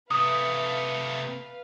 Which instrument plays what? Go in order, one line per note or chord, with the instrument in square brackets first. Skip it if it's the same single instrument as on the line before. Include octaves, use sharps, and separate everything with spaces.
[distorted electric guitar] C3 A3 [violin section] B4 F5 [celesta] D#6